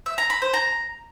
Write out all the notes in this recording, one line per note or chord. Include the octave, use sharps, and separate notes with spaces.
E5
A#5
B5
C5
A#5